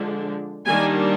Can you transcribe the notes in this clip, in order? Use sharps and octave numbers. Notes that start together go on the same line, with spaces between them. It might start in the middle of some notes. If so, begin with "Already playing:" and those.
Already playing: D3 F3 G#3 D4
D#3 G3 A#3 D4 G#5